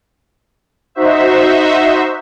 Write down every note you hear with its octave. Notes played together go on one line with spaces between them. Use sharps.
D#4 F#4 C5 E5